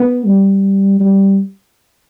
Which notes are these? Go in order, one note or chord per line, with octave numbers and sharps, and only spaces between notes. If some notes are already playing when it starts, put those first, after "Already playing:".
Already playing: B3
G3
G3